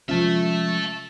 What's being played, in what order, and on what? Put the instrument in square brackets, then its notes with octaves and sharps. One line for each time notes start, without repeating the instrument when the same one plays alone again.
[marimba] C3 F4 [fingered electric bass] F3 G#3 C#4 [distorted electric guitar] E5 A5